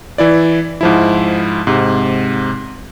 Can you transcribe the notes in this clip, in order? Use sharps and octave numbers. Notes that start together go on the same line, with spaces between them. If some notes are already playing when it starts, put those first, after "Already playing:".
E3 E4 D5
G#2 F3 E4
G#2 C3